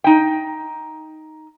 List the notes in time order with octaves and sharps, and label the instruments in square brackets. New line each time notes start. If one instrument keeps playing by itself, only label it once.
[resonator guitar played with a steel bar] D#4 G5